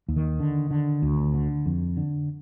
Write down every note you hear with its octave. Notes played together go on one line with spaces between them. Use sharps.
D#2
D#3
D3
D3
D2
D3
F2
D3